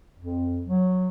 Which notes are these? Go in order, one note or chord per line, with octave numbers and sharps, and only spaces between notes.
F2
F#3